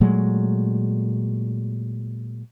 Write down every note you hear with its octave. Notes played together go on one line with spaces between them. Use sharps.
A#2 F#3 G#3 A3